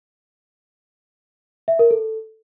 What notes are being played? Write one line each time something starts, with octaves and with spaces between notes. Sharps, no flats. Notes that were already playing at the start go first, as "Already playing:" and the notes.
E5
A#4
A4